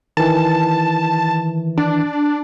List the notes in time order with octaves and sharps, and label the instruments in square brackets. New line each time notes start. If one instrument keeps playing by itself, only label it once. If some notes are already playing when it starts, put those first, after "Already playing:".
[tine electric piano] D#3 E3 [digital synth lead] A5
[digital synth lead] D4